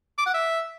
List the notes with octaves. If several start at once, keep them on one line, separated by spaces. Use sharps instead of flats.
D6
F#5
E5